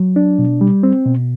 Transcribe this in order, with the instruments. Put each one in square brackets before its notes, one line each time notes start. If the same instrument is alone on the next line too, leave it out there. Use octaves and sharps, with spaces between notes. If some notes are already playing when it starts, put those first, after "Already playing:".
Already playing: [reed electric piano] F#3
D4
B2
G3
C4
B2